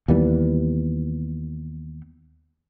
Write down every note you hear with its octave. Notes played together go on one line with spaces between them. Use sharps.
D#2 E3 G3 B3